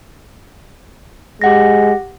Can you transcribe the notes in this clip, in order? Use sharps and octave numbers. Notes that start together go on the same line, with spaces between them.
G#3 G4 F#5 A#6